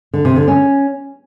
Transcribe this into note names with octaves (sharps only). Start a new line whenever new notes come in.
D3
C3
D3
C#4